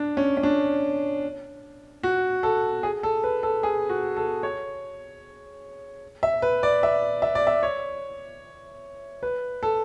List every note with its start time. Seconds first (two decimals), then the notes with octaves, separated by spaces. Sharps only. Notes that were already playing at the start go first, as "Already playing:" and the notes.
Already playing: D4
0.17 C#4
0.37 C#4
0.43 D4
2.03 F#4
2.43 A4
2.83 G#4
3.03 A4
3.24 B4
3.43 A4
3.63 G#4
3.89 F#4
4.17 A4
4.43 C#5
6.23 E5
6.42 B4
6.63 D5
6.83 E5
7.22 E5
7.35 D5
7.47 E5
7.63 C#5
9.23 B4
9.63 A4